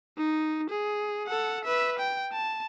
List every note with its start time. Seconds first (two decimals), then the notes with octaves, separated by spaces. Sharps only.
0.18 D#4
0.70 G#4
1.27 A4 F#5
1.65 B4 E5
1.99 G5
2.33 A5